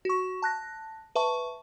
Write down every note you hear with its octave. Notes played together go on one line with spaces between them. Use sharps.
F#4 C#6
A5 F#6 A#6
B4 E5 A5 C#6